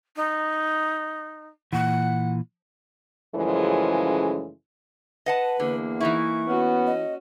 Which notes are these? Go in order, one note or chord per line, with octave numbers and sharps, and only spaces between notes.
D#4
A#2 E3 F#5
F#2 C#3 E3 F3 G#3 A3
B4 D#5 F#5 A5
E2 D3 A#3
E3 D#4 E4 C#6
B3 C#4 F#4
D#5